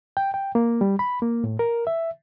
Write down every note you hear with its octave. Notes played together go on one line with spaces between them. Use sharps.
G5
G5
A#3
G3
B5
A#3
A2
A#4
E5